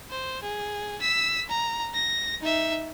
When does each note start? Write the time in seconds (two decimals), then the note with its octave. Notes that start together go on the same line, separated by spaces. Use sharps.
0.10 C5
0.43 G#4
1.01 E6 B6
1.49 A#5
1.94 A#6
2.41 D#4 E5